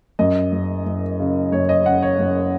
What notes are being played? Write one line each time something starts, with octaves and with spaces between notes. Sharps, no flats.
F#2 D#5
F#1
F#1
C#3
F#1 C#5
D#5
C#3 F#5
C#5
F#1